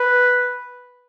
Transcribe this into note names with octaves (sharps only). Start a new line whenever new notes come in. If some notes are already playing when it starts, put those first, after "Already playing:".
Already playing: B4